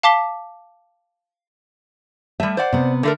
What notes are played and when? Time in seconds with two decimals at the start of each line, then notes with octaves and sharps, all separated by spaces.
0.03 F5 A5 D6 B6 G7
2.40 G3 A3 E5
2.57 C5 D5 F#5
2.73 C3 B3
3.03 D3 A3 A#4